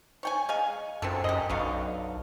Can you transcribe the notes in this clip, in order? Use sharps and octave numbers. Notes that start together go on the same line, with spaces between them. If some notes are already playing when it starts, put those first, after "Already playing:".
C#5 G5 G#5
G#3 F5 G#5
F#2 C4 F4 A4
F#2 G4 D#5
B1 D3 F#3 F5